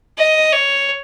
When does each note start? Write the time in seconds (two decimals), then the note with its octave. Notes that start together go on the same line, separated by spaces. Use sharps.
0.18 D#5
0.52 C#5